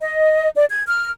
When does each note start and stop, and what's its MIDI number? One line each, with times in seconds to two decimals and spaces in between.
0.01 0.50 75
0.55 0.64 74
0.69 0.82 92
0.86 1.09 89